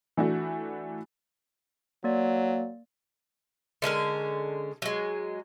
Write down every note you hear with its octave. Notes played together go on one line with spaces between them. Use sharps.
E3 A3 D4 F#4
F#3 A#3 D5
D3 G#3 C#4 A#4
F#3 G#3